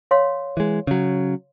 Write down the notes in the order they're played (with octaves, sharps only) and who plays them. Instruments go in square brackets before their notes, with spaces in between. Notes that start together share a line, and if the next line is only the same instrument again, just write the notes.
[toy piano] C#5 F5 C6
[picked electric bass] E3 G#3
C#3 F#3